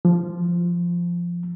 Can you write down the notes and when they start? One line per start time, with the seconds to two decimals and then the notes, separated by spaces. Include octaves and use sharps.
0.05 F3